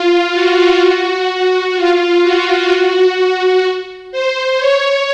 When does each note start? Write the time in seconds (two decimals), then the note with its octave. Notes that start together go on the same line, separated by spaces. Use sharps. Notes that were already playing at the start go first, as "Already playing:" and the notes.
Already playing: F4
0.34 F#4
1.29 F#4
1.76 F4
2.23 F#4
4.12 C5
4.59 C#5